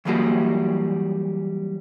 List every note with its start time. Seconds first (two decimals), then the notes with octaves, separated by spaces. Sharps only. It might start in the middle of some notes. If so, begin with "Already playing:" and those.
0.05 E3 F#3 G3 A#3 F#4 G#4